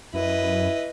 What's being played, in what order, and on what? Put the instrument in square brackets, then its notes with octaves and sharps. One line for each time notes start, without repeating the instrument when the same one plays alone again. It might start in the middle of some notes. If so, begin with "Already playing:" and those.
[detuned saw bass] F#2 [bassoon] E4 [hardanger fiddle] B4 D#5